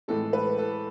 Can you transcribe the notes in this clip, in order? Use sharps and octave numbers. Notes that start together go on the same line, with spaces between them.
A2 E3 G#3 A4
B4
A4